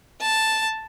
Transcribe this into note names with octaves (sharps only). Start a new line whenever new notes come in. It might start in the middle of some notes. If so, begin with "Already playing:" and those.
A5